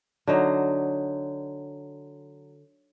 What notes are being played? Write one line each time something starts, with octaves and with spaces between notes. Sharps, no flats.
D3 F#3 D#4